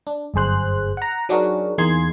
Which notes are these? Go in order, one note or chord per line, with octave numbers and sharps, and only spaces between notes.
D4
G1 F#2 G#4 C5 F#6
F#5 A#5
F#3 D4 D#4 F#4 G#4 A#4
E2 A#3 D#4 G#4 C6 G#6